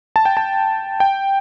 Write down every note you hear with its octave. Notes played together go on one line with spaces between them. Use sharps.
A5
G5
A5
G5